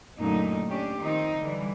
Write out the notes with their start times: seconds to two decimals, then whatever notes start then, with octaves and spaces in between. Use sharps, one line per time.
0.19 F#2 A#2 D3 A3 A#3 D#4
0.69 C#4 D4 G4
1.00 D#3 F3 C4 D#4
1.40 D3 E3 G3